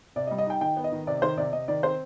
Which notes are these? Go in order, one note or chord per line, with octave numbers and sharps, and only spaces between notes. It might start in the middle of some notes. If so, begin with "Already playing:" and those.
C3 D5
D#5
G3
D#5
D#4 G5
D#3 G5
B3
D#5
D#3
C3 D5
D#3 C5
C3 D5
C3 D#5
D#3 D5
C4 C5